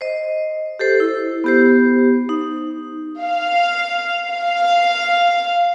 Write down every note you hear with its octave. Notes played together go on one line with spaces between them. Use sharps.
C5 D#5
G4 A4 C5
E4
B3 G4 C5
D#4
F5
F5